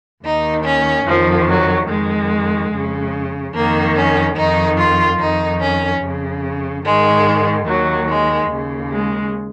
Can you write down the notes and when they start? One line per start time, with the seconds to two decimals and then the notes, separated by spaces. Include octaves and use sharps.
0.24 D#2 D#3 D#4
0.65 C#4
1.06 F2 D#3 F3
1.48 F#3
1.89 F2 D#3 G#3
2.72 F2 C#3
3.54 F2 D#3 A#3
3.96 C#4
4.37 F2 D#3 D#4
4.78 F4
5.19 F2 D#3 D#4
5.61 C#4
6.02 F2 C#3
6.84 G#2 D#3 G#3
7.67 D#2 D#3 F#3
8.09 G#3
8.50 D#2 C#3
8.92 G#3